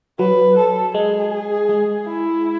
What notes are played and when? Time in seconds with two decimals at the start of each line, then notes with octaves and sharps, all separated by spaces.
0.19 F#3 B4
0.57 A4
0.94 G#3 G#4
1.69 G#3
2.07 E4